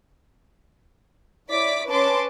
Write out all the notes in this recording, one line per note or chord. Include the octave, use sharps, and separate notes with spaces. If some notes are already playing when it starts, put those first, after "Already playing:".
E4 C#5 D5 D6 B6
C#4 B4 C#5 A5 C6 D6